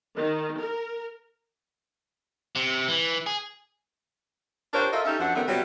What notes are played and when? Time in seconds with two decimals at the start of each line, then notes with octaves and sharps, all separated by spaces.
0.16 D#3
0.60 A#4
2.56 C3
2.88 E3
3.26 G#4
4.74 D4 F4 G4 A#4 C5 C#5
4.92 F4 A4 A#4 D#5 E5
5.05 C#4 D#4 G4 A4 E5
5.20 F#2 F3 D4 F#5
5.35 D#3 G3 A3 B3 C#4 A#4
5.48 C3 F#3 G3 B3 C#4 F4